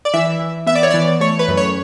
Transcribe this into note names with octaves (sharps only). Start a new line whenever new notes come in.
D5
E3 E5
E3
B3 E5
D5
C#5
E3 D5
A3 C#5
B4
F#2
C#5